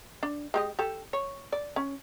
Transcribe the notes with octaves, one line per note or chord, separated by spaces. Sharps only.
D4
G#3 G4 D#5
G4 A4
C#5
D5
C#4